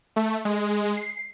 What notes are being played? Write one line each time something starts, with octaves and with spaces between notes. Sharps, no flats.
A3
G#3
C7